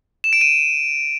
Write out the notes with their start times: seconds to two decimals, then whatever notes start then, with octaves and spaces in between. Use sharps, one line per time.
0.24 E7
0.33 D7
0.41 D#7